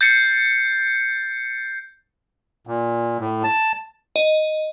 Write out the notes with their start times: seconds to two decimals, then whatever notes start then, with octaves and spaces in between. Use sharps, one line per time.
0.01 G6 A6 C7 C#7
2.67 A#2
3.20 A2
3.44 A5
4.16 D#5